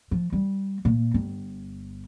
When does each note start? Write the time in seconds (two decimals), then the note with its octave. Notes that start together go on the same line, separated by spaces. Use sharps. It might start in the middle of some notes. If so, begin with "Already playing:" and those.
0.11 F3
0.32 G3
0.85 A#2
1.14 G1